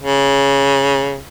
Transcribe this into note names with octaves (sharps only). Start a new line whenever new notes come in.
C#3